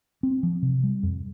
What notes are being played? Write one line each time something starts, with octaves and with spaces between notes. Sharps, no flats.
C4
F3
C3
G3
F2